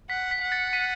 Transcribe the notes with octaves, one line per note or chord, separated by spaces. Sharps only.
F#5 B6
B6
F#5
A6 C#7
B6 D#7